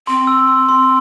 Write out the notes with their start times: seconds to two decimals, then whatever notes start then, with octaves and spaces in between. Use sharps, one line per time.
0.07 C4 C6
0.27 E6
0.47 C6
0.69 C6